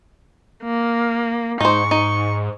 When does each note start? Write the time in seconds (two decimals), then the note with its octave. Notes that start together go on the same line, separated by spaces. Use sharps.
0.63 A#3
1.61 G#2 D#4 C5 C#6
1.91 D#4